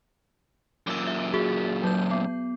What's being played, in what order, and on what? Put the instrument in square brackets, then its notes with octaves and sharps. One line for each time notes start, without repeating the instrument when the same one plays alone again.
[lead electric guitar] F#2 A#2 [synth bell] D6 E6
[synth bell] E5
F#4 G#4
F#3 G6
B3